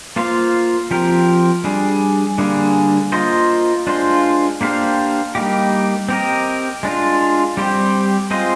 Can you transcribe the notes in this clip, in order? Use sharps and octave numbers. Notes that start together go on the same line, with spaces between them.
A#3 F4 C5 F5
F3 C4 G4 A#4
G3 D4 G#4
D3 G3 A#3 D4 G#4
A#3 F4 C5 D#5
G#3 D4 F4 C5
A#3 D4 G4 C5 F5
G3 A#3 D#4 G4
C4 G4 A#4 D#5
G#3 D4 F4
G3 C4 G4 C5
G#3 C4 F4 C5 D#5